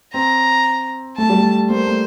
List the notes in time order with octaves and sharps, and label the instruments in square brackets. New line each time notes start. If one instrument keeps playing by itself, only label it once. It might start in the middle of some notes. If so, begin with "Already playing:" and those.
[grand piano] C4 [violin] A#5
[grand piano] A3 [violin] A5
[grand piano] G3
A3
[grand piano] A#3 [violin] C5
[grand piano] A3